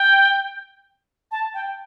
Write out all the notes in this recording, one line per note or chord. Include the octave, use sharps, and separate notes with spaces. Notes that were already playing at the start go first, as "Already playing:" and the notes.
Already playing: G5
A5
G5